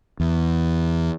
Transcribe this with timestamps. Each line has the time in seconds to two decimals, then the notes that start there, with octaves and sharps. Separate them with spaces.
0.20 E2